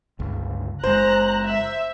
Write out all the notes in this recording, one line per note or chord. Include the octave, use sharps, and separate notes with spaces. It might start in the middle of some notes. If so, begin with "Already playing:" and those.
G1 C#2
F#1 G#3 C5 A#5 F#6
E5